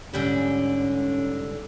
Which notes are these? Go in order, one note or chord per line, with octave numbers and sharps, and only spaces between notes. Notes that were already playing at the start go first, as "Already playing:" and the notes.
G#2 D3 G3 C#4